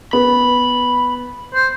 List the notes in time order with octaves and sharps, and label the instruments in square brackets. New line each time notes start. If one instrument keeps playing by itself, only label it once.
[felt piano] B3 [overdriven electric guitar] B5
[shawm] C5